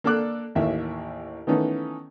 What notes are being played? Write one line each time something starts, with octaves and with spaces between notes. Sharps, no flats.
A#3 D4 A4 D5 D6 F#6
A1 D#2 E5
D#3 E3 A3 B3 C#4 D#4